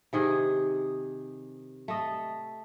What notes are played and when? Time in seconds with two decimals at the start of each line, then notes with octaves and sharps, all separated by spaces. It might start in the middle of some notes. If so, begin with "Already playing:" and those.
0.13 C3 D#3 G#4
1.88 A3 D#5